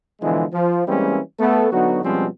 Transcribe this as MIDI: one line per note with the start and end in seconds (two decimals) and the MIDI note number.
0.22 0.44 47
0.22 0.44 50
0.22 0.44 52
0.22 0.44 53
0.22 0.44 56
0.53 0.83 53
0.88 1.19 52
0.88 1.19 55
0.88 1.19 56
0.88 1.19 58
0.88 1.19 60
0.88 1.19 61
1.39 1.69 57
1.39 1.69 59
1.39 1.69 69
1.72 2.00 50
1.72 2.00 54
1.72 2.00 59
1.72 2.00 63
1.72 2.00 66
2.04 2.27 47
2.04 2.27 53
2.04 2.27 55
2.04 2.27 56
2.04 2.27 60
2.04 2.27 61